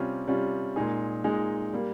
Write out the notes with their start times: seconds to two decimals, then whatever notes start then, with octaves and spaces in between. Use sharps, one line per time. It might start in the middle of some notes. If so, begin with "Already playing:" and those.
Already playing: C3 G3 C#4 F4
0.27 C3 G3 C#4 F4
0.76 A#2 G#3 D#4 G#4
1.24 A#2 G#3 D#4 G#4
1.73 G3 A#3